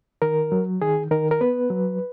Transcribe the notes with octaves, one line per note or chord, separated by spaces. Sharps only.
D#3 A#4
F#3
D#3 G#4
D#3 A#4
A#4
B3 B4
F#3